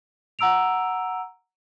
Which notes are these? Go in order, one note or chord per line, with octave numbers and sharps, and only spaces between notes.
F#5 A#5 E6 D7 F7